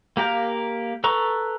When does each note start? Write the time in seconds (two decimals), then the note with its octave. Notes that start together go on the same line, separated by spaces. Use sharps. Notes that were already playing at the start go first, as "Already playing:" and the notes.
0.17 A#3 G4 A#4 F5
1.04 A4 B4 A#5 C#6